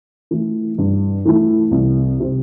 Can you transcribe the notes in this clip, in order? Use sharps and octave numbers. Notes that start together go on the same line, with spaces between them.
E3 A3 E4
G2
E3 A3 E4
C2
C3 G3 C4